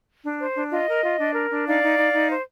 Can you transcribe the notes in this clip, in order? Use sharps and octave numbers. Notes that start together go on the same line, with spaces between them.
D4
C5
D4
F4 D#5
A#4
F4
D4
A#4
D4
D#4 D5 F5
D#4
D#4
D#4
C5